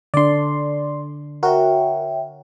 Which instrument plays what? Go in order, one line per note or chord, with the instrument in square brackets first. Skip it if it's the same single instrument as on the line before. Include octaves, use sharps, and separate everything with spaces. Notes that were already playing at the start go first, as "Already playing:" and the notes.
[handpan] D3 D4 [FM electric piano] D5 C6
[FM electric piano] F#4 A#4 [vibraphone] C#5 E5 G5